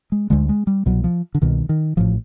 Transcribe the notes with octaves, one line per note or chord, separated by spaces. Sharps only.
G#3
D2 D3 G#3
G#3
G3
C2 B2 F#3
F3
D3
C2 B2 D#3
D#3
A1 A2 F3